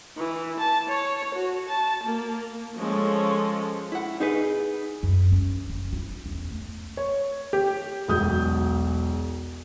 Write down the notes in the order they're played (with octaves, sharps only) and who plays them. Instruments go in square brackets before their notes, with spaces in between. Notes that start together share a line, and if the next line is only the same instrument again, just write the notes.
[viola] E3
A5
C#5
F#4
A5
A#3
[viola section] F3 G#3 C#4 A4 C#5
[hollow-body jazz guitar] E4 F#5
D#4 G#4 B4
[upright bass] F#2
C#4
F#1
E4 F4
E2 C#4
A3
[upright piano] C#5
G4
[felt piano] E1 B1 D#6 G6